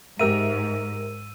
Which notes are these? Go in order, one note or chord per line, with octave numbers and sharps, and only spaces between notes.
G#2 G4 A#4 E5 E6 D#7